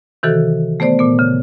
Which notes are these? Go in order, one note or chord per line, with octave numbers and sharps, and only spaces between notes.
C3 D#3 E3 F#4 A4
A3 B3 C5 D5
A#2 B3
C#3